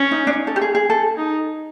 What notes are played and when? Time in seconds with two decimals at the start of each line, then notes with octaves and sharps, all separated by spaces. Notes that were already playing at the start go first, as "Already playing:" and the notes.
Already playing: C#4
0.11 D#4
0.27 D4
0.33 D#4
0.47 A4
0.56 G4
0.62 G#4
0.75 G#4
0.90 A4
1.17 D#4